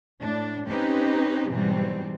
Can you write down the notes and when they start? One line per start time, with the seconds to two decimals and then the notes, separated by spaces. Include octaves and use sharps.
0.19 A2 D4
0.68 C4 C#4 D#4 G4 B4
1.49 G#2 B2 E3 F#3 G3 C4